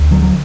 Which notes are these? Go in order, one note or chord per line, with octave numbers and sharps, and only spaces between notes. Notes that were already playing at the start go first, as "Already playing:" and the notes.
Already playing: D2
D3 F#3
F#3